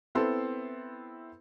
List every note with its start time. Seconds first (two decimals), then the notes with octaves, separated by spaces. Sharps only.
0.15 B3 C4 E4 A4 C6